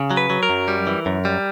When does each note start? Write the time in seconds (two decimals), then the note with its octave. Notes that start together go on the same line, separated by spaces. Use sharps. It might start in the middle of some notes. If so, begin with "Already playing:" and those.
Already playing: C#3
0.11 F#3
0.17 B4
0.30 F#3
0.43 A#4
0.50 F#2
0.68 G3
0.87 E3
1.06 F#2
1.25 G3